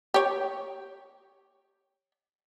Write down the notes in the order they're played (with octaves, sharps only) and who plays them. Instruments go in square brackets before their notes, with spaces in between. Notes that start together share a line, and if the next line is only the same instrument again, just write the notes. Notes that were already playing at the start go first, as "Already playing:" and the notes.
[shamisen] G4 C#5